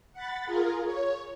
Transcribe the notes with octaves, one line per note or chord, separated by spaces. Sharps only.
F#5 B5 A6
F4 G#4 A#4
C#5